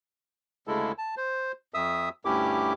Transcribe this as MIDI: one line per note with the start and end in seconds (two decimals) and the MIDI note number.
0.67 0.92 38
0.67 0.92 49
0.67 0.92 56
0.67 0.92 64
0.67 0.92 69
0.98 1.15 81
1.17 1.52 72
1.74 2.09 41
1.74 2.09 76
1.74 2.09 87
1.74 2.09 88
2.25 2.73 38
2.25 2.73 43
2.25 2.73 61
2.25 2.73 64
2.25 2.73 67
2.25 2.73 86